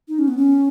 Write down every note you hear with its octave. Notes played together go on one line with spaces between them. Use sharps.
D#4
C#4
B3
C#4